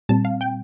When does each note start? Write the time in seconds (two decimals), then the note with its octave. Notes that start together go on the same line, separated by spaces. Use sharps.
0.09 A#2 G3 C4 A5
0.25 F5
0.41 G5